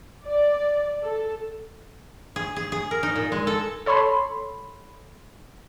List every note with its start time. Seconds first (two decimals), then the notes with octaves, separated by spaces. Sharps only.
0.24 D5
1.02 A4
2.36 G#4
2.56 G#4
2.72 G#4
2.91 A#4
3.03 D#4
3.16 A#2
3.32 G#3
3.47 A4
3.86 A4 C#5 B5 C6